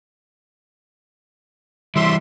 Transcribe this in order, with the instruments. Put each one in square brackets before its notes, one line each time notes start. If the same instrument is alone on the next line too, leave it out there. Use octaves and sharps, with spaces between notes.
[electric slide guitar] E3 G3 [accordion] E5 C6